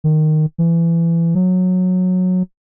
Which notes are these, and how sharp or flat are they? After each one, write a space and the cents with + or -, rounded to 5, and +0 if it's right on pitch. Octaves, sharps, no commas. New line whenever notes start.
D#3 -10
E3 +25
F#3 -15